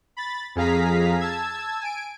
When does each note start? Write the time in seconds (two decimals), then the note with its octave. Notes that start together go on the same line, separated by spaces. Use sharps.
0.17 B5 A6
0.56 F2 G#4 F5 A#5 B6
1.19 A5 E6 G#6
1.81 G#5 D7